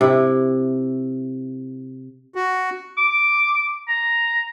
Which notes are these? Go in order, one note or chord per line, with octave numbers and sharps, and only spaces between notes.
C3 E4
F#4
D6
A#5